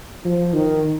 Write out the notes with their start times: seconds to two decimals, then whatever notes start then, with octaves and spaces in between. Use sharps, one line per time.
0.25 F3
0.53 D#3